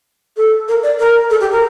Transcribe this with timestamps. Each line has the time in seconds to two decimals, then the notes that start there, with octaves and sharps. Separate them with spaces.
0.37 A4
0.68 A#4
0.83 D5
0.99 A#4
1.30 A4
1.40 G4
1.52 A#4